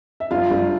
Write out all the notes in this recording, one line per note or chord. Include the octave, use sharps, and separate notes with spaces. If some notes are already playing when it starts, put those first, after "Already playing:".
E5
G1 F4 F5
G1